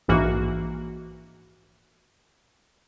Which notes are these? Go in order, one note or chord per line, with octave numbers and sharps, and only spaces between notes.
A#1 G#2 E3 A#3 F#4